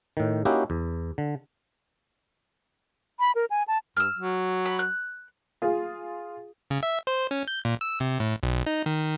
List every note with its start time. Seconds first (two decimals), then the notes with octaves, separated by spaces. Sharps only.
0.17 A2 D#3
0.45 A#3 C#4 D#4 E4 F#4 G4
0.70 E2
1.18 D3
3.20 B5
3.35 A#4
3.50 G#5
3.68 A5
3.97 G2 E6 F6
4.14 F#3
4.66 B5
4.79 F#6
5.62 F4 G#4
6.70 C#3
6.83 E5
7.07 C5
7.31 C#4
7.48 G6
7.65 A#2
7.81 E6
8.00 C3
8.20 A2
8.43 B1
8.66 D#4
8.86 D#3